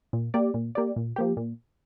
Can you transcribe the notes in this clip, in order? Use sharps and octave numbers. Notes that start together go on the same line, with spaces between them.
A#2
A#3 G4 D5
A#2
A#3 G4 D5
A#2
F3 A#3 G4
A#2